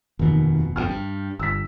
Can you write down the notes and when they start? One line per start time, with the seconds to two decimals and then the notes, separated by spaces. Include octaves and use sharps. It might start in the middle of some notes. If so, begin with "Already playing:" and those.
0.19 F1 D#2 B2
0.76 G1 F2 B2 G5 F6
0.89 G2
1.39 G1 E6 B6